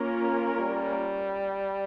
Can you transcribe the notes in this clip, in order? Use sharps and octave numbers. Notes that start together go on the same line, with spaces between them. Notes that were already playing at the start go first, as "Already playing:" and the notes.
Already playing: A#3 C#4 F4 A#4
G3